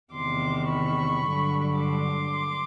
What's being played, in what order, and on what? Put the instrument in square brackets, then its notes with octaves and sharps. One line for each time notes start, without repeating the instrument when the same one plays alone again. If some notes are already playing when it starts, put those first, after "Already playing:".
[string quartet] E2 C3 D#3 C6 D6
B5 C#6
G2 D3 F#3
C6 D6